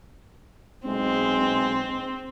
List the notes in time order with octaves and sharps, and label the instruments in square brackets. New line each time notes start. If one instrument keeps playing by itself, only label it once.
[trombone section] B1 G#3 [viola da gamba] C4